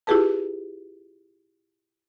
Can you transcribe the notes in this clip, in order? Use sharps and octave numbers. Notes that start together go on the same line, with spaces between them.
E4 F4 G4 G#4 B4 A5